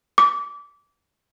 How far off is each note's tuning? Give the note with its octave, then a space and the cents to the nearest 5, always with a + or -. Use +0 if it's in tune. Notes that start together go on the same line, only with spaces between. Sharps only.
D6 -25